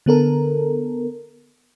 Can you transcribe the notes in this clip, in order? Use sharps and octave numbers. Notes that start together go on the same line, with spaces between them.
D3 B3 A4 A#4